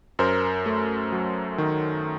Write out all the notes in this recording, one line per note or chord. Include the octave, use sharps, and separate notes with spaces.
F#2 A#4 C5
A3
F#3
D#3